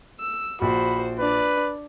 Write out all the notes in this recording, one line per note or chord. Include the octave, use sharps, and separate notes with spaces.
E6
A#1 F#4 C5 B5
D4 B4 D5